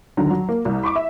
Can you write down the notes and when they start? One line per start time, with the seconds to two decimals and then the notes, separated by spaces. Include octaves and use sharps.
0.17 D#2 D3 F#3 A#5
0.30 F#3
0.49 A#3
0.65 C2
0.84 B5 C#6 D6
0.96 E5